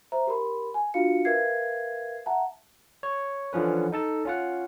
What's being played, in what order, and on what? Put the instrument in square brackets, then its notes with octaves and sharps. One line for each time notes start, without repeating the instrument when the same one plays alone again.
[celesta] C5 E5 A#5
G4 A#4 B5 C6
G#5
D4 F4 F#4 F5 C#7
A#4 B4 E5 F5 G#6 C7
E5 F#5 A5 A#5
[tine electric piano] C#5
D3 E3 F3 C#4 B4
D#4 A4 A5
C#4 F4 F#5